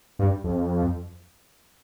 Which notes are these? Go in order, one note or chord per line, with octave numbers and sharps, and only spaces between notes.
G2
F2